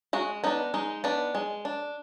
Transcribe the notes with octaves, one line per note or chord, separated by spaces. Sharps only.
G#3 F#4
B3 D4 D#4
G#3 D#4
B3 D4
G#3
D4